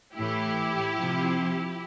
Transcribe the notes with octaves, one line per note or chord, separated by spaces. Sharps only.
A2 E3 E4 G4
C3 F3